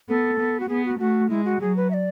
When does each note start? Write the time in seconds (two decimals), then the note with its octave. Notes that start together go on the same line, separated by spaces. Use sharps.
0.09 B3 A4
0.40 B3
0.60 F#4
0.69 B3 G#4
0.85 F#4
0.99 A3 F#4
1.30 G#3 E4
1.45 F#4
1.61 F#3 G#4
1.76 B4
1.90 E5
1.94 D5